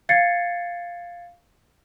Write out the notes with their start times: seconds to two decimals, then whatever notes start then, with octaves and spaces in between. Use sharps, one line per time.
0.09 F5 G#6 A6 C7 C#7